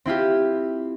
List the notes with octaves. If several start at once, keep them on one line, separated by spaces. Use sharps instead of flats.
C4 E4 F4 G4